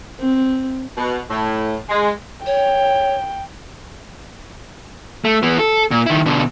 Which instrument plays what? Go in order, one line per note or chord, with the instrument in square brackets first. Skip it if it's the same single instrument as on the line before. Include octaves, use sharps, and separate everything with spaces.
[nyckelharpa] C4
[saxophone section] B2
A2
G#3
[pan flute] C#5 [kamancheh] G5
[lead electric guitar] A3
E3 B3
A4
A#2
D#3 E4
B2 D3